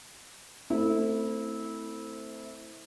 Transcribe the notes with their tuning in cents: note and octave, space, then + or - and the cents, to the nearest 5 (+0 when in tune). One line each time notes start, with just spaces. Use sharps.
A3 +25 C4 +0 E4 -20